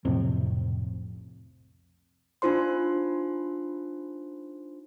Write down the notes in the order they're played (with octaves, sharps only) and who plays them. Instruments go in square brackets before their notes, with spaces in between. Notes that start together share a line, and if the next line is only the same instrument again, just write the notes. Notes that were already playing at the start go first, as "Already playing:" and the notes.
[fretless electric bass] B1 F2 A2 C3
[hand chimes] D4 D#4 F4 C5 C6